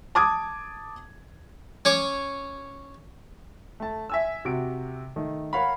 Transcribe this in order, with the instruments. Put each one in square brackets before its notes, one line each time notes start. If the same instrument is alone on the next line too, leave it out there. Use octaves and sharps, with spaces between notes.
[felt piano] A5 D6 D#6 G#6
[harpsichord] C#4 C#5 D6
[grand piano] A3 A5
E5 G#5 E6
C3 F#4 D7
D#3 A3
A#4 C#5 F5 F#5 B5